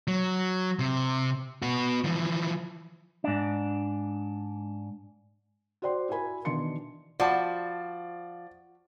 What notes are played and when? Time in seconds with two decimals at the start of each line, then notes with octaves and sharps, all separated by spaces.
0.08 F#3
0.79 C3
1.62 B3 F#4
2.04 E3 F3
3.24 G#2 D4
5.82 F#4 C5 D5 G5 C6
6.09 E4 F#4 A#4 G#5 B5
6.45 B2 D#3 E3 D4 C6 C#7
7.20 F3 F#4 D5 A5 B5